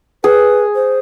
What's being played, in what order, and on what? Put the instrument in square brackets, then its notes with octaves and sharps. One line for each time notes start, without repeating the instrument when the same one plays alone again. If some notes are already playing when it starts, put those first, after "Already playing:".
[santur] G#4 [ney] B4
[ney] C5